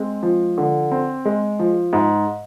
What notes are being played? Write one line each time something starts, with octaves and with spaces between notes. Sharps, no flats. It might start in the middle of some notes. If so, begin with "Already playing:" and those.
Already playing: G#3 C4
F3
D3
C4
G#3
F3
G#2